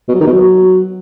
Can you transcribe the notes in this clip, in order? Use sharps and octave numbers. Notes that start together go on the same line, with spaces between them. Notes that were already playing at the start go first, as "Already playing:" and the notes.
B2
F#3
D#3
B2
F#3